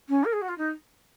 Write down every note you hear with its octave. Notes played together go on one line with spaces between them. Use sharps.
C#4
A#4
G#4
F#4
F4
D#4